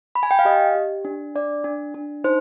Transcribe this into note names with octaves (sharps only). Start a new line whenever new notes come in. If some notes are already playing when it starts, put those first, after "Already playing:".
B5
G#5
G5
F5
G4 D#5
G4
D4
D4 D5
D4
D4
D#4 C5